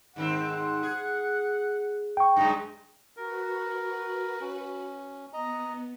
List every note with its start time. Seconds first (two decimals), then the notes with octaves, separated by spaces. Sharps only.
0.16 G#2 D#3 C4 F#5
0.83 G#4
2.17 G5 C#6
2.37 F#2 G#3 D#4
3.17 F#4 A#4 B4
4.41 C#4
5.33 B3 D#5 A#5